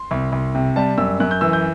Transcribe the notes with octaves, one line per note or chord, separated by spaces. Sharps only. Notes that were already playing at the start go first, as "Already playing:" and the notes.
Already playing: C6
C2
C2
C3
G3 A5
F#2 E6
F#2 F#6
G6
E3 E6
G6